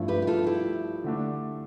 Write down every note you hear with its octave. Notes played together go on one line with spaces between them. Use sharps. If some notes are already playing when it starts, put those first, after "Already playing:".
Already playing: G2 F3 A3 E4
G4 B4
G4
F4 A4
E4 G4
D3 A3 D4